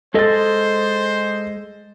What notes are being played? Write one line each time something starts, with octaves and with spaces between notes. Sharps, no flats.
G#3 G#4 A4 C5 D#5 A6